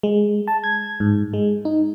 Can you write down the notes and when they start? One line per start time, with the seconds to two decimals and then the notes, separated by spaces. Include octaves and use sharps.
0.03 G#3
0.48 A5
0.64 G#6
1.00 G#2
1.33 G#3
1.65 D#4